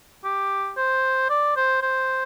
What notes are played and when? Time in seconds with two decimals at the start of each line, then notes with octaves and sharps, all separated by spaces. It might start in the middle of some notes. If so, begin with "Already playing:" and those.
0.24 G4
0.77 C5
1.30 D5
1.56 C5
1.82 C5